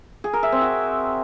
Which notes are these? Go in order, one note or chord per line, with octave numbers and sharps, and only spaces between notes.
G#4
A#4
E5
C4
F#4